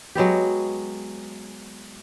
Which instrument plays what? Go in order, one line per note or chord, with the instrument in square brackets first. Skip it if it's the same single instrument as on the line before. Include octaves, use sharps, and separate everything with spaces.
[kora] F#3 G#3 B3 G4